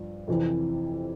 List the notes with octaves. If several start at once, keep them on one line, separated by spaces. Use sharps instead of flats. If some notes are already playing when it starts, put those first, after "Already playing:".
Already playing: G2 F3
F2 C3 E3